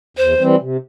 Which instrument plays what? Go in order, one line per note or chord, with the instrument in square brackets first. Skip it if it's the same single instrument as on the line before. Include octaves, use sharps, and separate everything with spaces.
[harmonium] E2 [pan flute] C5
[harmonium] E3 G3 C4
C3